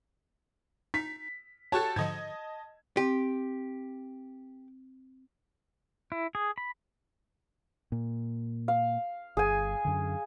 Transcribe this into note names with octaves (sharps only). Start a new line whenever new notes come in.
D#4 B6
F#4 G4 A4 C#5 A5 C#6 F#6
G#2 D3 F3 D#5 G#6
C4 G4
E4
G#4
B5
A#2
F5
G1 G#4 G#5
F#2 D3